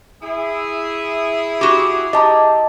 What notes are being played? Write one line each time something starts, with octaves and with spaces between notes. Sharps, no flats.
E4 G#4
F#4 G4
G4 D#5 A5 A#5